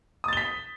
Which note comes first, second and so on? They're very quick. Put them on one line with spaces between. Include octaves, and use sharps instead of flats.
D#6 A6 G7 B6